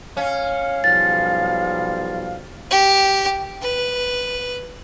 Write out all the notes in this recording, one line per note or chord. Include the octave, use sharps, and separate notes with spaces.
C#4 F5
B1 F3 G3 A6
G4
B4